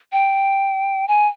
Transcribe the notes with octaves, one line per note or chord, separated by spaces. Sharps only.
G5
G#5